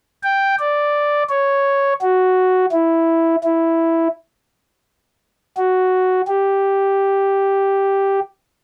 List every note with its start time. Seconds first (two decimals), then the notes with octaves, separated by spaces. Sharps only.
0.23 G5
0.59 D5
1.30 C#5
2.01 F#4
2.72 E4
3.44 E4
5.57 F#4
6.28 G4